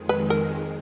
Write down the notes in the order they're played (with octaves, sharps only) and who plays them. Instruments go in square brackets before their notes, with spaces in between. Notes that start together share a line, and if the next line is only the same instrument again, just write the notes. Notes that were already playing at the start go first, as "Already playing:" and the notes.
Already playing: [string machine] F2 D#3 G#3
[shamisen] B4
A#4